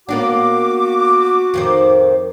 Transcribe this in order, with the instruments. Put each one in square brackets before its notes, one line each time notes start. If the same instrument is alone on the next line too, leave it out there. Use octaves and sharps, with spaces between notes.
[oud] A#3 B3 D4 [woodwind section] F#4 D6
[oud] F2 D#3 C5